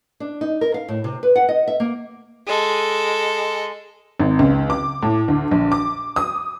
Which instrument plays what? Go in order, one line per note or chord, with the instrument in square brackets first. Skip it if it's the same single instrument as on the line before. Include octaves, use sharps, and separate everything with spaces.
[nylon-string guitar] D4
D#4
A#4
F5
A2
C3
B4
F#5
D#5
E5
A#3
[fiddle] G#3 A4
[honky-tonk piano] G#1
C#2
D6
A2
D2
A#1
D6
D#6